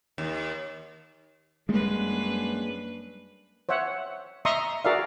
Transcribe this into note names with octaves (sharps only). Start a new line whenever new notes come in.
D#2
F#2 G3 G#3 A#3 D4 B4
C5 C#5 E5 F#5
D#5 E5 A#5 C6 C#6 D#6
F#4 G#4 A#4 D5 E5 F5